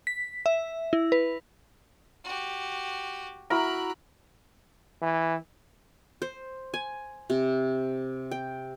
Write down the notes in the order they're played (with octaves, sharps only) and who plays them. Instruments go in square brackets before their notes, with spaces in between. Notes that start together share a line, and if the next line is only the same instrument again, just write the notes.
[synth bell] B6
E5
E4
B4
[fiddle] F#4 G4
[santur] E4 F#4 [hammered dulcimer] A#4 [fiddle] B5 F#6
[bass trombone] E3
[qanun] C5
G#5
C3
G5